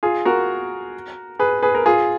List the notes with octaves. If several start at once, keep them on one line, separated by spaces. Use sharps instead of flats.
F4 G#4
F#4 A#4
G#4 B4
G#4 B4
A#4
F4 G#4